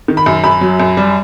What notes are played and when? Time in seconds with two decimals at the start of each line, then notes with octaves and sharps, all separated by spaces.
0.08 D#3
0.17 B5
0.26 F#2
0.44 F#2 B5
0.61 F#3
0.80 F#2
0.97 G3